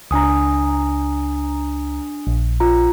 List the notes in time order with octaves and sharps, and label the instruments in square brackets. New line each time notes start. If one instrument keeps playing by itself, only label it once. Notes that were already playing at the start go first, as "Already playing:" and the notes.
[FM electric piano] C#2 A#5 [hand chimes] D4 G#5 D#6
[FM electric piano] A#1
[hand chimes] F4 A#5